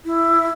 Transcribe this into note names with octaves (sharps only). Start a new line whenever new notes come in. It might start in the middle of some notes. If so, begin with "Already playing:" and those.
E4